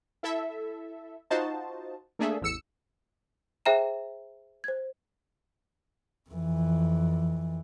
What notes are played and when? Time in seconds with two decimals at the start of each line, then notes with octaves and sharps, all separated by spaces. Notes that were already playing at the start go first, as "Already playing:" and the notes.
0.23 E4 A4 E5
1.31 D#4 F4 F#4 C5 D#5 A5
2.19 A3 A#3 D4 G#4 A4 E5
2.41 A1 E2 E6 C#7
3.66 G#4 C5 E5 G5 A#5 E7
4.64 C5 G#6
6.30 F2 E3